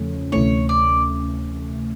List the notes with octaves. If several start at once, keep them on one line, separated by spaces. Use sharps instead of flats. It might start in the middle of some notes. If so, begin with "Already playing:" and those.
Already playing: E2 C#3 F3 A3 C#4
D2 C3 E3 A3 C#4 C#5
D5